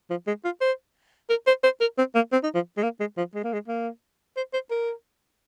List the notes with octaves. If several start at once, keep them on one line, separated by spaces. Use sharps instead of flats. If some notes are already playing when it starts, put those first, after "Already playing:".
F3
G#3
F4
C5
A#4
C5
C5
A#4
C4
A#3
C4
D#4
F3
G#3
A#3
G#3
F3
G#3
A#3
G#3
A#3
C5
C5
A#4